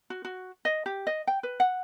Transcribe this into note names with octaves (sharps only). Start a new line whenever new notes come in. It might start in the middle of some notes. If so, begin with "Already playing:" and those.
F#4
F#4
D#5
G4
D#5
G5
B4
F#5